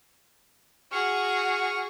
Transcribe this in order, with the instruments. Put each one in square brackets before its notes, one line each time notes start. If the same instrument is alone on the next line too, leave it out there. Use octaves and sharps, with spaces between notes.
[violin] F#4 G#4 [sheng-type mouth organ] C#6 F6